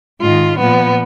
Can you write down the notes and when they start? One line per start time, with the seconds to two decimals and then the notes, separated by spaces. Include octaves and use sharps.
0.21 G#2 D#3 F4
0.58 A#2 F3 B3